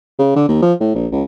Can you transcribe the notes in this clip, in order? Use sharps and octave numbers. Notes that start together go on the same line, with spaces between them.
C#3
D3
D#2
F3
A2
A#1
C#2